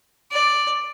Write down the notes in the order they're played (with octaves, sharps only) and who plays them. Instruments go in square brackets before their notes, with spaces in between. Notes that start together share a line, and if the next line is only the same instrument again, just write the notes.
[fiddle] D5